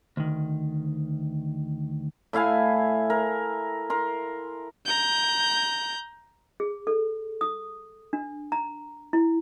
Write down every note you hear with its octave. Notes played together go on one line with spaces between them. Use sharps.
D2 D#3
A2 E4 F5 G#5
A#4
A#4 C6
A#5 G6
G#4
A4
D#6
D4
A#5
E4